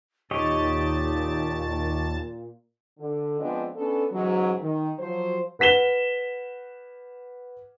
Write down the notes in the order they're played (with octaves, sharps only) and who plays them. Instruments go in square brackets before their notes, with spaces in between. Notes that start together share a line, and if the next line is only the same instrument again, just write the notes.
[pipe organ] D#2 A5 [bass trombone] A#2 [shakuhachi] D#4 [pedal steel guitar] G4 C#5 D#5
[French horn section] D3
F3 G#3 B3 C4 D4 D#5
B3 C#4 D4 A4
G#2 C#3 E3 F#3
D#3
F3 F#3 C5
[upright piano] B4 F#5 B6 E7 G7